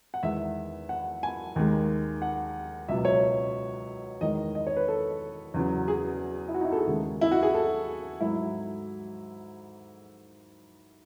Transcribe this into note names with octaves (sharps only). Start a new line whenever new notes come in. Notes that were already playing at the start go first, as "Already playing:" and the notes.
F#5
E2 D#3 G#3 E5
F#5
G#5
D#2 D#3 G#3
F#5
C#2 B2 F#3 E5
C#5
E2 D#3 G#3 D#5
D#5
C#5
B4
A4
E2 C#3 F#3
G#4
E4
F#4
D#4
E4
A4
G#4
D#2 C#3 G#3
E4
F#4
G#4
A4
G#2 F#3 A3 E4